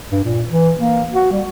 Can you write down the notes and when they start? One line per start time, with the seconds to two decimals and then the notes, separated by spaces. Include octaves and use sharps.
0.12 G2
0.24 A#2
0.49 E3
0.79 A#3
1.13 F#4
1.32 G3